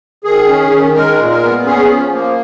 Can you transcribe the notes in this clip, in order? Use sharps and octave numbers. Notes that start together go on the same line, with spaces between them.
D#3 G#4
C#4
D#3
G#3 A#4
A#2
A#4
B3
C#4 G#4
F3
A#3